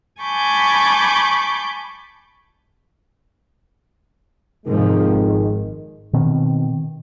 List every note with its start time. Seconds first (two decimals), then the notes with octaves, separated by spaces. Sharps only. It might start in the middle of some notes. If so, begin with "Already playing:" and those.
0.22 G#5 A5 B5 C#6 D6 G6
4.66 F2 G#2 C3 D#3 F3 G#3
5.13 G#1
6.13 B2 D#3 C4